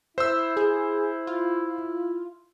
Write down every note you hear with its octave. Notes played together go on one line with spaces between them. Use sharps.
E4 C5 E5 E6
G#4
F4